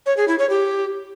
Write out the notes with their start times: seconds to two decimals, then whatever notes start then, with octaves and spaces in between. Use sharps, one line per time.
0.06 C#5
0.17 G#4
0.28 E4
0.39 C#5
0.50 G4